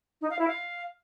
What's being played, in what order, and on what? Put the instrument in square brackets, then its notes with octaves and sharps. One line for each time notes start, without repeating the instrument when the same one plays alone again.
[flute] D#4
F5
E4
F5